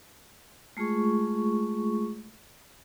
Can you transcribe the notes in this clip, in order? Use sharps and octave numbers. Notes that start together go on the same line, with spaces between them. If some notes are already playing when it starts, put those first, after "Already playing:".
G#3 A3 F4 G#4 C#6